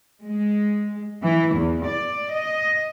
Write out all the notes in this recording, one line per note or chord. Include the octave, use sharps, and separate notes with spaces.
G#3
E3
E2
D5
D#5